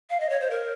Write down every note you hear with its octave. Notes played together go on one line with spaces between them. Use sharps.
F5
D#5
C#5
C5
A#4